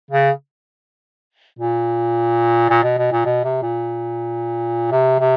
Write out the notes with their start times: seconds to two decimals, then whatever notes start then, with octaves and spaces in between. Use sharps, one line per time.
0.11 C#3
1.59 A#2
2.70 A#2
2.83 B2
2.98 B2
3.12 A#2
3.25 B2
3.44 C3
3.62 A#2
4.92 C3
5.20 C3